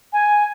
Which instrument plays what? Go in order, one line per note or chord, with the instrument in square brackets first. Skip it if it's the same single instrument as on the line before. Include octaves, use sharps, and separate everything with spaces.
[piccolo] G#5